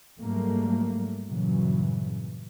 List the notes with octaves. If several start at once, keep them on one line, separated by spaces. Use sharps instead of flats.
G#2 F#3 G3 A3 A#3
G2 A#2 C#3 E3 F#3